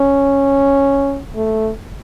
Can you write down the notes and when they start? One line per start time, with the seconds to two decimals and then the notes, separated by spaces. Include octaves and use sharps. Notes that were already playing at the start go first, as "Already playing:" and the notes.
Already playing: C#4
1.36 A3